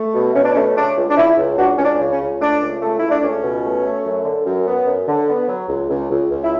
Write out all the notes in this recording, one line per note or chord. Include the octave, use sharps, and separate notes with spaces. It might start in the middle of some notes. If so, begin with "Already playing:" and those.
Already playing: A3
B2
B2 C#4
D4
A3 C#4
C#3 D4
C#2
D4
C#2 C#4 E4
C#2
C#2 D4 F#4
C#2 C#4
D4
C#3
C#4
C#2
A3 D4
C#2
A3
A3 E4
D4
C#2 C#4
B2
A3
A3
F#2
D3
F#2
B3
F#2
D3
B3
F#3
C#2
C#2
C#2
C#2
E4